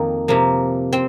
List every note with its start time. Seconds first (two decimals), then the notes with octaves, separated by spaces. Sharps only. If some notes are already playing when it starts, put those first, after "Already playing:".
Already playing: F2 D#3 A#3
0.28 C3 F3 A#3
0.93 C4